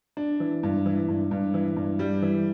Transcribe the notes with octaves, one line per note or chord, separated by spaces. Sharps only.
D4
E3
G2
E3
G2
G2
E3
G2
G3
E3